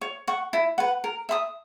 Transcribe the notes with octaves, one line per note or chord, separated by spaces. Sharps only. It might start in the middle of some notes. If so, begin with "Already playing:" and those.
C#5
F#5 C#6
E4
B4 F#5
A#4
E5 B5 D#6